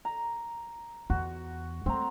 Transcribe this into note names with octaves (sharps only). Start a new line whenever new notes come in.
A#5
E2 F#4
G#3 A3 C4 A#5